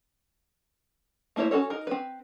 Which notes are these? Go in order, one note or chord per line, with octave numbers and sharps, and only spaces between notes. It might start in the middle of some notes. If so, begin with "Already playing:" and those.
A3 A#3 E4 C5 C#5
C#4 F4 F#4 A4 C#5
D#4 A#4
C4 B4